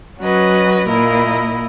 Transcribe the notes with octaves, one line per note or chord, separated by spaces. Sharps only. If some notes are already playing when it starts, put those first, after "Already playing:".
F#3 C#4 F#4 B4 D#5
A#2 A#3 E4 A#4 D#5